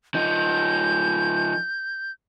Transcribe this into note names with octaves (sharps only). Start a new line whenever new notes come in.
F3 D#4 G6